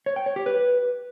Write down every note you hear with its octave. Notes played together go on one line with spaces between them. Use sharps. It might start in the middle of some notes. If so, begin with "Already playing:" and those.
C#5
G5
C#5
G4
B4